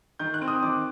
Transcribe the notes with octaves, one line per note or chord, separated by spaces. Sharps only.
D#3 G6
F#6
C4
D#6
D#3 D6